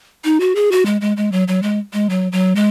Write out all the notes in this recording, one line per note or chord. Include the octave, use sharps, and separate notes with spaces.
D#4
F#4
G#4
F#4
G#3
G#3
G#3
F#3
F#3
G#3
G#3
F#3
F#3
G#3